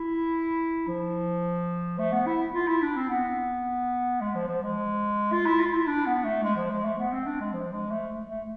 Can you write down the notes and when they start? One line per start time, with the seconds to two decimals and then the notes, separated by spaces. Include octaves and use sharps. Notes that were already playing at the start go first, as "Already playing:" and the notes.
Already playing: E4
0.88 F3
1.99 A3
2.12 B3
2.27 E4
2.54 F4
2.68 E4
2.82 D4
2.97 C4
3.09 B3
4.21 G#3
4.35 F3
4.48 F3
4.63 G#3
5.32 F4
5.46 E4
5.60 F4
5.74 E4
5.87 D4
6.06 B3
6.25 A3
6.43 G#3
6.56 F3
6.70 G#3
6.85 A3
6.98 B3
7.13 C4
7.26 D4
7.40 G#3
7.53 F3
7.73 G#3
7.91 A3
8.29 A3